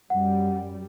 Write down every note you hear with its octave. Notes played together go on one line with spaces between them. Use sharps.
F#2 G3 F#5